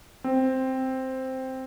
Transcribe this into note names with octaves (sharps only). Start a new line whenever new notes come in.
C4